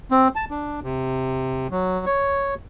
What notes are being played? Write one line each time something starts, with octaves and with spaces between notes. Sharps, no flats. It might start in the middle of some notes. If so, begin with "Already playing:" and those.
C4
A5
D4
C3
F#3
C#5